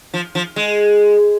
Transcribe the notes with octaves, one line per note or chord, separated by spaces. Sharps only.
F3
F3
G#3